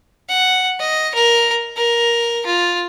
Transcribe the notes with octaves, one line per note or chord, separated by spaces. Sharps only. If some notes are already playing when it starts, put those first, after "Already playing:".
F#5
D#5
A#4
A#4
F4